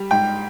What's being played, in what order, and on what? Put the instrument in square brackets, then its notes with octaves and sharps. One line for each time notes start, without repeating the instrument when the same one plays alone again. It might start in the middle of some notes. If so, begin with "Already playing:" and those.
Already playing: [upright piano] G3
[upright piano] G#2 [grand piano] G5